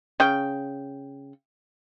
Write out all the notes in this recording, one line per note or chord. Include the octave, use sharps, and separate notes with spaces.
C#3 G5